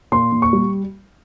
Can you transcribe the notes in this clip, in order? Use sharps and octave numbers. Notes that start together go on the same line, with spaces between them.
A#2 C6
A#2
C#6
G3